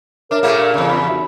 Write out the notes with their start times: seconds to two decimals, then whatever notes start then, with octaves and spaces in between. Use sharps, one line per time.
0.31 D4 A#4 C#5 E5 D6
0.43 A#2 A3 A#3 G#4
0.59 G4 D5
0.74 E2 C#3 A#5
0.90 B5
1.07 D#4 F#4 E5